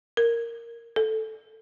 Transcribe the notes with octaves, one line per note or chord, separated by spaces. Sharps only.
A#4
A4